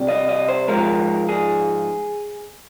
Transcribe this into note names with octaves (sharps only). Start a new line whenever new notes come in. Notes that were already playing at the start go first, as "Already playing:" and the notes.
Already playing: C2 C3 G3
D#5
D#5
C5
G#2 F3 G#3 A#4
G#4